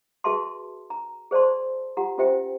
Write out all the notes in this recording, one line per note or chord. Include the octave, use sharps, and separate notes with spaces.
F#4 G#4 B4 E5 A5 C6
A#5
G#4 C5 D5 A5 C6
F4 G4 F#5 A#5
C#4 F4 G4 C5 E5 G5